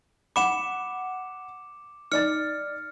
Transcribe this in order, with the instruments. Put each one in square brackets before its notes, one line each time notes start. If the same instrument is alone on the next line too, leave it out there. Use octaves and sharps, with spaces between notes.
[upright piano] F#5 B5 [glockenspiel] D6 C#7 E7
[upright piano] D#4 D5 A6 [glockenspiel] F6 C#7